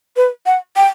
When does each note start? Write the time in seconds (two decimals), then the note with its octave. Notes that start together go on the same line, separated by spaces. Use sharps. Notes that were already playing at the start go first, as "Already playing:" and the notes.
0.17 B4
0.46 F#5
0.76 G5